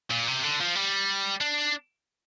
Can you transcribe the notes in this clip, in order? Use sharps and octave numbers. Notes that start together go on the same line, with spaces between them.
A#2
C3
D3
F3
G3
D4